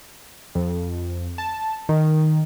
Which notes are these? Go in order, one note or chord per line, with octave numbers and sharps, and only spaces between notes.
F2
A5
D#3